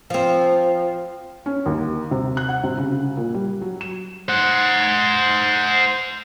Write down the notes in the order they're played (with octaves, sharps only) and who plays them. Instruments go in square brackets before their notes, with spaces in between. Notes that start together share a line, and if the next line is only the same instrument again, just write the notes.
[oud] F3 C4
[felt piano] C#4
D#2
C3
F#6
F#5
C3
C#3
C#3
A#2
G3
F#3
E7
[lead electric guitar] C5 F#5